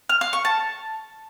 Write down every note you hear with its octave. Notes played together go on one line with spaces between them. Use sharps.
F6
F5
C#6
A5